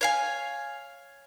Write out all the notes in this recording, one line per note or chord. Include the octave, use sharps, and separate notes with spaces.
C#5 F5 G#5